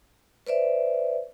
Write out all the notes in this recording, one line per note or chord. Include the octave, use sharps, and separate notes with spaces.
B4 C5 D5 E5